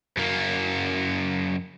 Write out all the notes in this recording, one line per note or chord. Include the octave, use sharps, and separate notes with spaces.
F#2 A#3